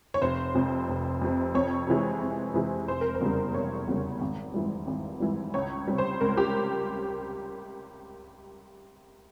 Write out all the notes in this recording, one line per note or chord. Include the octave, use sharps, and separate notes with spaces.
C#5
F1 C5
F2 C3
F1
F2 C3
F2 C#5
C3 E3 G#3
F2
C3 E3 G#3
F1 C5
A#4
C5
E2 C#3 G3
F1 C#5
E2 C#3 G3
G#1
G#2 E3 G3
G#1
G#2 E3 G3
C#2 C#5
C3 G3
C5
C#2 A#4
G4